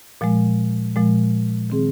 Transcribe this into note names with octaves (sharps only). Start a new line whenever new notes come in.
A#2 F3 G#3
A#2 F3 G#3
D#3 C4 G#4